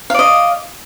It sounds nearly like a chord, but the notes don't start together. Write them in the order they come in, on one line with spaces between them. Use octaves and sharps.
F5 D5 D#5